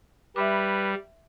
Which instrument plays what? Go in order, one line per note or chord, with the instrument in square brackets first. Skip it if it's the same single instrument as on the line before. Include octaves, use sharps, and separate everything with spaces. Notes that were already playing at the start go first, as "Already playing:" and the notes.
[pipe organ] G3 [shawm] B4 [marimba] E5 B5 D6